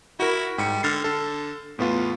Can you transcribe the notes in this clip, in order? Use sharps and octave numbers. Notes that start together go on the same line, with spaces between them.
E4 F#4 A#4
G#2 G3 C#7
D3 F6 A6 C7
D3 A4
E2 A2 B3 F4